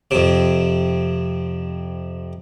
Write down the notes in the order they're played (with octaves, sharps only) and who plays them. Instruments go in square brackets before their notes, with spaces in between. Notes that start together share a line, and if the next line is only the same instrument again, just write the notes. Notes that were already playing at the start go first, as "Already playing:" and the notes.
[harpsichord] F2 C3